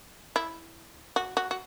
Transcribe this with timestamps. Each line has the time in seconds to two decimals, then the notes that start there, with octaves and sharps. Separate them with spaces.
0.36 E4
1.16 F#4
1.37 F#4
1.51 F#4